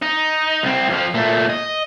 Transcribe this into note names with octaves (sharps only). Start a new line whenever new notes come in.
D#4
C2 C4
F2 F3
A#2 A3
D#5